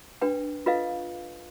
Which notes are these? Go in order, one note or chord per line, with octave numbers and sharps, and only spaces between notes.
D4 B4 G5
F4 A4 B4 D#5 F5